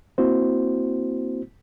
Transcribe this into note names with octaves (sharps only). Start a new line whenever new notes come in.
A#3 C4 E4 F#4 C5